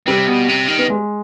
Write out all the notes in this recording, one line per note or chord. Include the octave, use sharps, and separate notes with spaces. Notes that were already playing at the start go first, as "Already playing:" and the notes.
C3 G3
B2
C3
D#3
B3
G#3